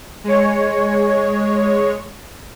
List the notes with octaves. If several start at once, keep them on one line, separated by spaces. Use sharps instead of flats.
G#3 C#5